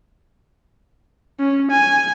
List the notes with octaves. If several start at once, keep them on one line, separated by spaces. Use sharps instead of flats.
C#4
G#5